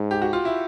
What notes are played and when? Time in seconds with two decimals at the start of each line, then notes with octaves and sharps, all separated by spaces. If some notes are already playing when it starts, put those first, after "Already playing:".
Already playing: G#2
0.11 G4
0.22 F#4
0.33 F4
0.45 E4